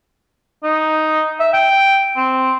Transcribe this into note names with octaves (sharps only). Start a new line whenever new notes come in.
D#4
E5
G5
C4